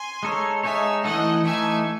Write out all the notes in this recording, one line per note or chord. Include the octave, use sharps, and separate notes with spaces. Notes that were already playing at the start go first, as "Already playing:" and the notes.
Already playing: G#5 C6
G#3 D#4 A4 C#5
G#3 D#4 A4 C#5 E5 G#5
E3 A3 D#4 A4 D#5 F#5
E3 A3 D#4 A4 E5 G#5